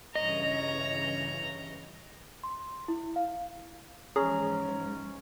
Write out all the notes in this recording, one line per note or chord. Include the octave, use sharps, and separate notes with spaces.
G2 C#3 E3 C#5 D#5 A#5
C6
E4
F5
G#2 E3 F3 C#4 G#4 A#5